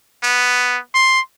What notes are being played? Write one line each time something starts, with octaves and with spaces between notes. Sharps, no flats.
B3
C6